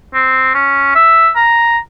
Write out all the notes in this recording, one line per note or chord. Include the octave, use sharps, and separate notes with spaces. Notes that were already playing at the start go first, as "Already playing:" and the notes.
C4
C#4
E5
A#5